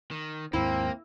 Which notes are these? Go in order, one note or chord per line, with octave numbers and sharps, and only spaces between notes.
D#3
D#2 G#2 A#3 C4 E4